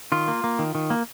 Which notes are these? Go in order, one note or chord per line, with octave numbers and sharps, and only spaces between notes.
D#3 F4
A#3
A#3
D#3
D#3
A#3